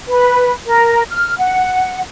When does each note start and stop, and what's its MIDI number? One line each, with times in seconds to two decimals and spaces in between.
0.07 0.52 71
0.66 1.02 70
1.10 1.37 89
1.38 2.00 78